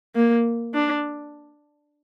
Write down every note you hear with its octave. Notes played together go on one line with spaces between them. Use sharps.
A#3
D4